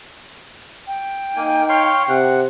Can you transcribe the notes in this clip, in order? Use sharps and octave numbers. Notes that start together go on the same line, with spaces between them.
G5
A#3 D#4 G#5
C#5 F5 C6
C3 F#5